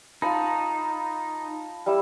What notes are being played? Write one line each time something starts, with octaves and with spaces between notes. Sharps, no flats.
D#4 F4 A5 B5
G3 E4 E6